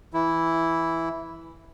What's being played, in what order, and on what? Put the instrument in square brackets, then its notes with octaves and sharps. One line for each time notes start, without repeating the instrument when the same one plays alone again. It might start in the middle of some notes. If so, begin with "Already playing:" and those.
[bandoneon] E3 E4